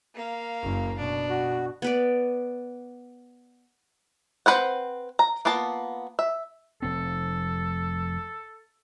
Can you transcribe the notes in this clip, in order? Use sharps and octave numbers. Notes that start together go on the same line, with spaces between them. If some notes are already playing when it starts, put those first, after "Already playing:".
A#3 F5
F#1
B2 D4
F#4
B3 B4 D5
C4 E4 B4 C5 F#5
A#5
A#3 B3 F4 A5
E5
F1 C4 A4